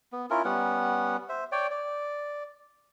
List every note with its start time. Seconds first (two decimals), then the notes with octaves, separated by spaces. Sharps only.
0.12 B3
0.30 C#4 E4 F4 A#4
0.45 G3 B3 C#4 F#5
1.29 C5 E5
1.52 C#5 D5 G5
1.71 D5